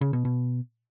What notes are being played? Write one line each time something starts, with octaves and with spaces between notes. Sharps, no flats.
C#3
B2
B2